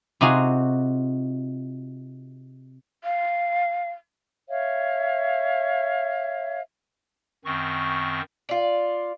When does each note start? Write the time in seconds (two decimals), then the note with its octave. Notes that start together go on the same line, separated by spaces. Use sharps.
0.21 C3 D#4 F4 F#4 G#4
3.04 F5
4.49 C#5 E5 F5
7.45 F#2 D#3 C4 C#6
8.49 F4 D5